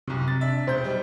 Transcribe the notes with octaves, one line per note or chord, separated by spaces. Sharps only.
C2 F#2 C3
A6
D4 E5
E1 C5 G6
G3 D#4